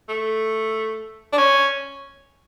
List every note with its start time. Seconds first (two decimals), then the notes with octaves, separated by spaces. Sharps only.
0.09 A3
1.33 D4
1.38 C#4